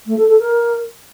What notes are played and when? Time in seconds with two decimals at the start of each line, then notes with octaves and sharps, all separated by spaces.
0.06 A3
0.17 A4
0.28 A4
0.39 A#4